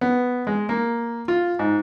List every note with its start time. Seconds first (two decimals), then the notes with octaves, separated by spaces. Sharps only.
0.01 B3
0.47 G#3
0.69 A#3
1.28 F4
1.59 G#2